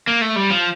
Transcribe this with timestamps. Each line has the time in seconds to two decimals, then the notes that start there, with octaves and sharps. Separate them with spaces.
0.07 A#3
0.21 A3
0.36 G3
0.51 F3